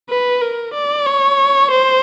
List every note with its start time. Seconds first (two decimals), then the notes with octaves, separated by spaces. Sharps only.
0.10 B4
0.42 A#4
0.74 D5
1.06 C#5
1.71 C5